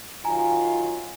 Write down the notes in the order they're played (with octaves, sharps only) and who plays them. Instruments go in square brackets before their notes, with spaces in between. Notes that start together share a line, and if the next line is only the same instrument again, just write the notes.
[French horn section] D#3 F#3 F4 [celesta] G#5 A#5